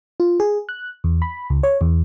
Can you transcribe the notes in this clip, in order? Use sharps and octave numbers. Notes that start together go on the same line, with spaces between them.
F4
G#4
F#6
E2
B5
C#2
C#5
E2